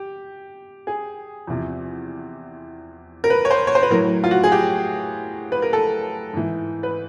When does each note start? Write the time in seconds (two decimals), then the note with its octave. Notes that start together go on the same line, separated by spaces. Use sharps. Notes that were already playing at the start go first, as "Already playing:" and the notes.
Already playing: G4
0.87 G#4
1.47 E2 C3 F3
3.24 A#4
3.30 B4
3.45 C#5
3.51 C5
3.67 C#5
3.75 C5
3.83 B4
3.90 A2 F#3 A#4
4.24 F4
4.31 F#4
4.44 G#4
4.52 G4
5.52 B4
5.62 A#4
5.73 A4
6.33 G#2 E3
6.83 B4